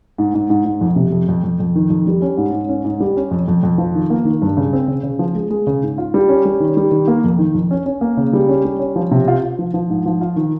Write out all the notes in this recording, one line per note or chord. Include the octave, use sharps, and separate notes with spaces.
G#2
G#2
G#2
G#2
F2
C3
F2
F2
F2
F2
D#3
F2
G3
C#4
G#2
G#2
C#4
G#2
G3
C#4
F2
F2
F2
F3
D#3
A#3
D#3
G2
C#3
C4
C#3
C#3
F3
G#3
G#3
C#3
G#2
F4
G3
C#4
G3
D#3
G3
D#3
A#3
F2
D#3
F2
C#4
C#4
A#3
C#3
G3
C#4
G3
C#4
F3
C3
F4
F4
F3
F3
G#2
F3
F4
D#3